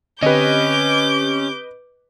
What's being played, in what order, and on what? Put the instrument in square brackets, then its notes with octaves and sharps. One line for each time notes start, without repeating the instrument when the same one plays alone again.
[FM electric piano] D3 C4 G4 [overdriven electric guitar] C#4 [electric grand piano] B4 D#5 [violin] D6 G6